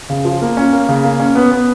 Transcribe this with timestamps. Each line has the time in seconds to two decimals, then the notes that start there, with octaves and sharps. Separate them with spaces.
0.10 C#3
0.25 F3
0.42 A#3
0.57 C#4
0.73 A#3
0.89 C#3
1.04 A#3
1.20 C#4
1.35 B3
1.51 B3